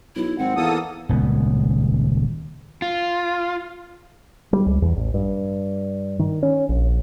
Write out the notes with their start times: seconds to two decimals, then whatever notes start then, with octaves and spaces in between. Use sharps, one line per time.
0.16 B1 E4
0.38 G#1 C4 F#5
0.57 E2 A#3 A4 D#6
1.09 D#1 C#2 B3
2.82 F4
4.53 G3
4.66 C#2
4.82 E2
4.96 A1
5.14 G2
6.19 D#3
6.43 C#4
6.69 A#1